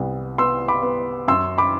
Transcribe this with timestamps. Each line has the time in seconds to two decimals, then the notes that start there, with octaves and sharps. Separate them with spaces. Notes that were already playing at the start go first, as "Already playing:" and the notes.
Already playing: C2 B3
0.38 B3 C6 E6
0.68 B5 D6
0.83 B3
1.28 F#2 C6 E6
1.58 B5 D6